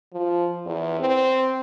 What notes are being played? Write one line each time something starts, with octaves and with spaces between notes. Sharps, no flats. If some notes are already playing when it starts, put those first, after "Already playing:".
F3
E2
C4